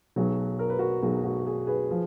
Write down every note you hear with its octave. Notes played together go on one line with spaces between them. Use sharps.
B1 B2 F#3 G#4
A#4
B4
F#4 A#4
B1 B2 F#3 G#4
F#4
G#4
G#4 B4
F3